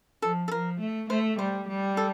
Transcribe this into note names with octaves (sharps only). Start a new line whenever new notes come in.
F3 A4
A4
F3 A#4
A3
A3 C5
G3 C5
G3
A4